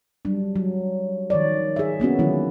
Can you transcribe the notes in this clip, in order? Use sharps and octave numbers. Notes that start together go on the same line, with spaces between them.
F#3 G3 D4
F#3
D#3 F3 C#5 D5
G#4 E5
A#3 B3 C#4 F#4
D3 D#3 F3 F#3 G#3 E4